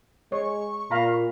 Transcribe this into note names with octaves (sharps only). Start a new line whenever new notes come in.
G#3 C#5 C#6
A#2 F5 A#5 B5